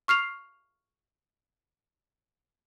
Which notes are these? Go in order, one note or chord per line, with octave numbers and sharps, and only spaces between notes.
C#6 F6 C7 F7